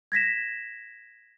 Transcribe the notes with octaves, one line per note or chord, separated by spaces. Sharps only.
G#6 A#6 B6 E7